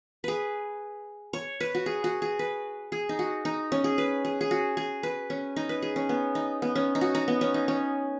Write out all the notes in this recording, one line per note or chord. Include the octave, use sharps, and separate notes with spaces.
G#4 B4
C#5
B4
F#4
G#4
F#4
G#4
B4
G#4
D#4
F#4
D#4
C#4
G#4
B4
G#4
G#4
F#4
G#4
B4
C#4
D#4
B4
G#4
C#4
B3
D#4
B3
C#4
D#4
F#4
D#4
B3
C#4
D#4
C#4